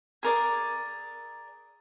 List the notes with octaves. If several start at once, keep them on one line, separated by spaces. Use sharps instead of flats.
G#4 A#4 D5